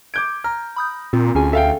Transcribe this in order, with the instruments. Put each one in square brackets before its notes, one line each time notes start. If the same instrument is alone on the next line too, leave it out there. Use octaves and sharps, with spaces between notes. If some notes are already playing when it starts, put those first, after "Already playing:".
[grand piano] D6 G6 D7 [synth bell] G#6
[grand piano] A#5 [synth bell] F6
[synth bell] B5 D#6 G6
[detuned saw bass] A#2 [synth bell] C4 F4
[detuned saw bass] D2 [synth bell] C#4 G#4 G#5
[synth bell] A4 [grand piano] E5 F5 G5